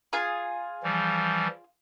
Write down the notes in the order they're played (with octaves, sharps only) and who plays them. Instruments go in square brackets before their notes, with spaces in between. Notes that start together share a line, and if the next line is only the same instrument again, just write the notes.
[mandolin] F4 G#4 G#5
[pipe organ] E3 F3 G3